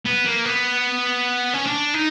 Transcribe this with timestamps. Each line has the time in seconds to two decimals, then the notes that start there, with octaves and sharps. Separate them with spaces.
0.05 B3
0.25 A#3
0.45 B3
1.53 C#4
1.66 D4
1.94 D#4